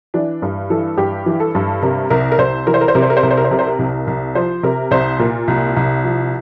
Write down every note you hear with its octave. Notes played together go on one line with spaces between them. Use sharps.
E3 D4
G2
E3 A4
G2 G4
E3
A4
G2
C3 A#4
C2 A#4
A#4
C2 C5
E3 A#4
C5
A#4
C5
C3 A#4
C5
A#4
C5
C2 A#4
C5
A#4
C5
C3 A#4
C5
A#4
C2
C2
F3 C5
C3 A#4
C2 C5
A#2 A#4
C2
C2
F3